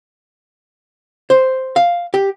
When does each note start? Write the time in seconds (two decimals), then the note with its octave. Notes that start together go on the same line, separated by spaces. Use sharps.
1.30 C5
1.76 F5
2.14 G4